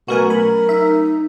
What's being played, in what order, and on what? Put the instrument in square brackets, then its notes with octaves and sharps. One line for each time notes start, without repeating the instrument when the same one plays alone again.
[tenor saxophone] B2 [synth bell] F#3 A3 C#4 [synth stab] F#4 A#4 G#5
[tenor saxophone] A#4 [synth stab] B5
[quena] D#4 [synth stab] E5